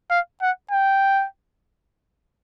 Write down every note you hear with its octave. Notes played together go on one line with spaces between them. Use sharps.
F5
F#5
G5